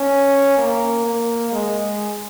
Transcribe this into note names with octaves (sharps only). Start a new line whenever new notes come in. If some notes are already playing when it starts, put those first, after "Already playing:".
Already playing: C#4
A#3
A#3
G#3